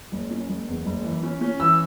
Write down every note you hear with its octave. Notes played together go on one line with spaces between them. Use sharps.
F#1
C#4
F#1
E2
F#1
E3
C#4
C#4
E3 E6